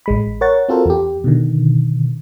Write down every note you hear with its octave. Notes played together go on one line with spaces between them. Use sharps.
A1 G#3 B5
A#4 C#5 F#5 A6
C4 F4 F#4 A4 A#4 C5
E2 G4
B2 D3 D#3